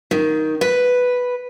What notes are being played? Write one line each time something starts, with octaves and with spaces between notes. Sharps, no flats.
D#3
B4